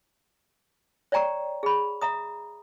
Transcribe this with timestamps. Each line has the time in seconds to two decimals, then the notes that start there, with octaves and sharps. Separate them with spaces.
1.12 C#5 D5 G5 A#5 C#6
1.63 G#4 B5
2.01 E5 A#5 D#6